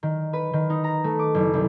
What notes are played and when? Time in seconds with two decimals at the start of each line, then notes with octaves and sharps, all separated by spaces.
0.03 D#3
0.33 B4
0.53 D#3
0.70 D#4
0.84 A#5
1.04 A3
1.19 D6
1.34 F#1
1.53 C2